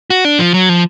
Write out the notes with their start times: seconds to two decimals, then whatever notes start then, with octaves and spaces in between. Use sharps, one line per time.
0.10 F#4
0.25 D4
0.39 F3
0.54 F#3
0.69 F3